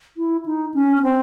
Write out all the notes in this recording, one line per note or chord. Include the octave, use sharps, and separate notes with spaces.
E4
D#4
C#4
C#4
C4